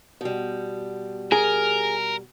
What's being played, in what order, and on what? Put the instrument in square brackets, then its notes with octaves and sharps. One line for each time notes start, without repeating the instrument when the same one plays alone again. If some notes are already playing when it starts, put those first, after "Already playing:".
[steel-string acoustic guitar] B2 G3
[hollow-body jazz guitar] G#4 [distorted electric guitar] A#4